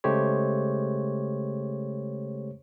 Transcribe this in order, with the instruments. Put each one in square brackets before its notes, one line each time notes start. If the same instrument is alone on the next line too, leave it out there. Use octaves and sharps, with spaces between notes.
[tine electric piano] C#3 G#3 A3 G4 C5 C#5